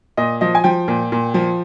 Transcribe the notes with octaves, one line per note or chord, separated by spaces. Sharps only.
A#2 D#5
F3 D#5
G#5
F3 G5
A#2
A#2
F3